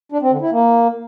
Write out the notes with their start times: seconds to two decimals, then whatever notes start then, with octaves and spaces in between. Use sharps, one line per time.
0.12 D4
0.22 C4
0.31 D3
0.41 E4
0.51 A#3